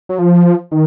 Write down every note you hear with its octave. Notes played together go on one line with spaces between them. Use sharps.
F#3
F3
D#3